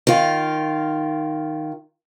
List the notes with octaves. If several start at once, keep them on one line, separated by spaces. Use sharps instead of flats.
D#3 F4